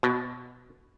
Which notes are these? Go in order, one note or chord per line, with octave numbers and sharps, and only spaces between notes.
B2